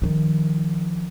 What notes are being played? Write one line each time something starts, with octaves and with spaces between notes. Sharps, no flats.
D#3 F3